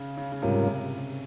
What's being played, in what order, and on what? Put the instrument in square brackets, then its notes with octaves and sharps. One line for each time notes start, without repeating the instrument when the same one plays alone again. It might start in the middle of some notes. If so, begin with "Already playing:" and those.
Already playing: [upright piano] C#3
C#3
C#3
[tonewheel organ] G#2 G3 C#4 F4 A#4 [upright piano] C3